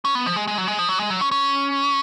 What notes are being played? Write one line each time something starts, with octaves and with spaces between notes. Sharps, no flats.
C#4
B3
F3
G#3
G#3
F#3
G#3
F3
F#3
G#3
F#3
C#4
C#4